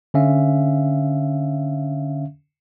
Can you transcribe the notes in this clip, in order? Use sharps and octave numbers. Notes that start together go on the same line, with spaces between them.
D3 C#4 E5 F5